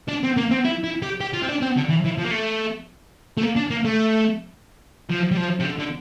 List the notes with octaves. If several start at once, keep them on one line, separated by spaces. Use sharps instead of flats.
D4
C4
A#3
C4
E4
E4
G4
G4
F4
C4
D4
C4
D3
E3
E3
F3
A#3
A3
A3
A#3
D4
A#3
A3
F3
G3
F3
C3
D3
D3